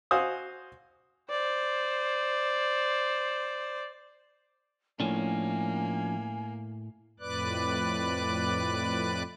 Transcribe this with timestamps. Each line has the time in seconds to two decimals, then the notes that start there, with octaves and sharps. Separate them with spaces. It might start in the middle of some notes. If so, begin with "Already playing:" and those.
0.11 F#4 C5 F5 G#5 D#6
1.30 C5 D5
5.00 A2 F3 A#3 C#4 D4 G#5
7.20 F2 A2 B4 D5 D6 F#6